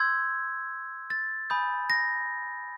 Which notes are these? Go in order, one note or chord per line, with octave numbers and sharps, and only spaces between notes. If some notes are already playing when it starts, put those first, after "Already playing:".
Already playing: C6 E6 G6 G#6
A6
G#5 B5 D#6 G6
A#6